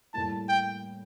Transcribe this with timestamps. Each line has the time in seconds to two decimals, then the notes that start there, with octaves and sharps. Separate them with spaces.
0.14 A2 G3 A#3 E4 A5
0.49 G5